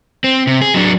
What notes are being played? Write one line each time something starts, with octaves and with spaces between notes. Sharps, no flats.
C4
C3
G#4
F#3 D4